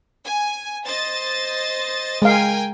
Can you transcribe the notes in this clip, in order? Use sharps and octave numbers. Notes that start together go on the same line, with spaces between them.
G#5
C5 D#5 A6
G#3 A#4 F5 G5 G#5